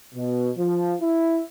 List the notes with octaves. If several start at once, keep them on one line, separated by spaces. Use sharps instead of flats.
B2
F3
E4